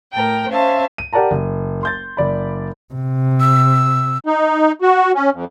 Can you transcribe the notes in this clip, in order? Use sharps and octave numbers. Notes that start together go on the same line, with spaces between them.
A2 A#4 G5
C#4 C5 E5 F5 A5
D#7
G4 A#4 D5 F#5 A5 A#5
F#1
C6 G6 A6
F#1 D5 B5
C3
E6
D#4
F#4
C#4
F2